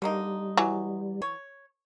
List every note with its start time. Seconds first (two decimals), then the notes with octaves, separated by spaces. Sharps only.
0.02 D3 G3 A#3 D#4
0.57 E3 F#3
1.22 C#5